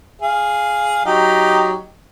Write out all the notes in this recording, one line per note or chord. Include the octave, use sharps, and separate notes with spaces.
G#4 F5
F#3 D#4 G4